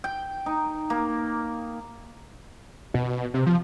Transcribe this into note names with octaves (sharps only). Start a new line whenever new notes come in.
G5
D#4
A#3
B2
C3
F3